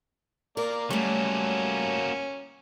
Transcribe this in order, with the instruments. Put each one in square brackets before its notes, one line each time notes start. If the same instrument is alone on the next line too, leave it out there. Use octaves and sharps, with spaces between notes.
[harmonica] A#3 D5 [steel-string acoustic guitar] A#4
[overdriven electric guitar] F#3 A#3 [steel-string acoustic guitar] G3 A3 [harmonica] C#4